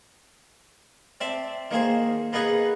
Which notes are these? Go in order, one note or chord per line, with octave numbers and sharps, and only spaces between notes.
C4 D5 E5 A5
D#3 A#3 G#4 C5
A#3 B3 D#4 G#4 B4